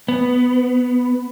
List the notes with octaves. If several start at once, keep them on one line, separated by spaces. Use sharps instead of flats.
B3